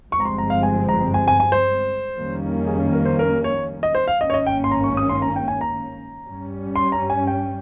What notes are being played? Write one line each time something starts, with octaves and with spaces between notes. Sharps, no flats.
G1 G2 F3 G#3 C4 C#6
A#5
C6
A#5
F5
G#5
A#5
G#5
G#5
G#5
C5
F2 D#3 G3 A#3 C#4
G#4
A#4
C5
A#4
C#5
D#5
C5
F5
G#1 G2 D#3 A#3 C#4 D#5
C#5
D#5
G5
C6
A#5
C#6
D#6
C6
A#5
G5
G#5
A#5
G2 G3 C#4
C6
A#5
G#5
G5